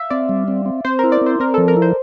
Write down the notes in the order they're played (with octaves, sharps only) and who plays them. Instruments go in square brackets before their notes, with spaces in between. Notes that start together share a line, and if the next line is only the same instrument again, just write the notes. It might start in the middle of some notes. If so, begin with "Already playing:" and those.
Already playing: [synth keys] E5 F5
[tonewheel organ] C4 [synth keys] D5
[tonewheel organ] G3
C4
C4
[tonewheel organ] C4 [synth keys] C5
[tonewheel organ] E4 [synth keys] A#4
[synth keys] D5
[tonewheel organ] C4 [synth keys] C5
[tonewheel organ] C4 [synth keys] A#4
[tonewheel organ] F3 [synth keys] A4
[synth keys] A#4
[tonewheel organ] E4
[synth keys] C5